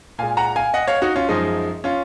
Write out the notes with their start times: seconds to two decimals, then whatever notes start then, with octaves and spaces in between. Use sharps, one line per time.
0.19 A#2 G#3 F5 G#5
0.37 F#5 A#5
0.56 F5 G#5
0.74 D#5 F#5
0.88 C#5 F5
1.02 D#4 F#4
1.16 C#4 F4
1.29 F#2 F3 G#3 D#4
1.84 C#4 F4